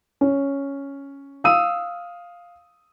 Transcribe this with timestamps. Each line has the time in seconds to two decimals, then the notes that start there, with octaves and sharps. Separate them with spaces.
0.21 C#4
1.44 F5 D#6 E6 D#7